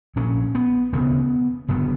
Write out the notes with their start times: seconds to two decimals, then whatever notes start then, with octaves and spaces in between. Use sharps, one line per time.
0.16 A#1 A#2 C#4
0.55 B3
0.93 E1 D2 C#3 B3
1.68 F#1 F#2 D3 B3